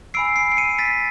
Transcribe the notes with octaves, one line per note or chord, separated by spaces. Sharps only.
G#5 B5 E6 C7 D7
C7 D7
D7
C#7 D#7
A6 B6